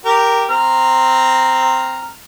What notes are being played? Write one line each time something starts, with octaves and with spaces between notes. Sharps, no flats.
G4 A#4
C4 A#5 F6